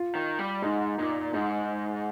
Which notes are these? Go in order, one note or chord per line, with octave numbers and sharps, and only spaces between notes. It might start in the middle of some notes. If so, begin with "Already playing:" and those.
Already playing: F4
D#3
G3
G#2 D#4
A#2 D#4
G#2 D#4